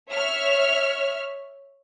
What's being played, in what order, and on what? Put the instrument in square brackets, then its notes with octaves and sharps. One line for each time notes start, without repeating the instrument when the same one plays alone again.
[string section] C#5 E5 F6